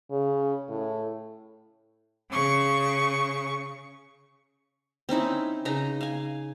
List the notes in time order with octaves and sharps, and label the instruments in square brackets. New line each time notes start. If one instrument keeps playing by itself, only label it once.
[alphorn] C#3
A2
[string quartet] C#3 C#6
[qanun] C4 C#4 D#4 E4
C#3 D#4 D#5 A#5
F5 G#5